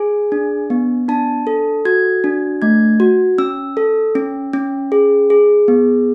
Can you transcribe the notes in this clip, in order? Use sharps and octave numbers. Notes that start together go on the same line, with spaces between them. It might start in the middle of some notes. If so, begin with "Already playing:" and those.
Already playing: G#4 G#5
D4
B3
D4 A5
A4
F#4 G#6
D4
A3 G#6
F#4
C#4 E6
A4
C#4
C#4
G#4
G#4
B3